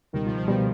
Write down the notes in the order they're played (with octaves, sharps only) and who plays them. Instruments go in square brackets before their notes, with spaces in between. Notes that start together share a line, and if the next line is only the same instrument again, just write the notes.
[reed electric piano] C#2 B2 G3 [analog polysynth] D#3
[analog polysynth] F3
F3
[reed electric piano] B2 G3 [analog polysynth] D#3